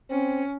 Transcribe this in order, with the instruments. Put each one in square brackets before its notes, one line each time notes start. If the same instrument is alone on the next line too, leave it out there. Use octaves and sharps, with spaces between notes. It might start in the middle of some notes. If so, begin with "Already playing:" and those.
[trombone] C4 [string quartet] C#4